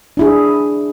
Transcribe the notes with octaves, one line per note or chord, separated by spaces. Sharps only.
D4 E4 G#4